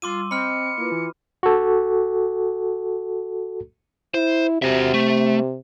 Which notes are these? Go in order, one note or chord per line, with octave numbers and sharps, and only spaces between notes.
G3 F4 C6 D6 E6 D#7
C4 D#5 B5 F6 C#7
A#3 E4 F4 B4
E3
F#4 A4
E4 C5
C3 F#4 E5
A3